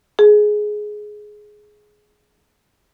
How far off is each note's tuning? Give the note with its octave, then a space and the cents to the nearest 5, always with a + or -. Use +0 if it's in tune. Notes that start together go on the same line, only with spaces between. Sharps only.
G#4 +10